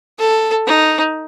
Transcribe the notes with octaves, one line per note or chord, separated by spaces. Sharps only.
A4
D#4